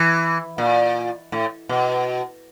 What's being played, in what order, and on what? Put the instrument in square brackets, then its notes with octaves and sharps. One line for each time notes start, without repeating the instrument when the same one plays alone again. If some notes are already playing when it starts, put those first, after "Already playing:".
Already playing: [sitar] E3
A#2
A2
B2